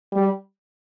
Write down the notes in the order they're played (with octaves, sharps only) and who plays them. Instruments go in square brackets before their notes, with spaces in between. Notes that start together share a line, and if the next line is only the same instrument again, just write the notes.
[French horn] G3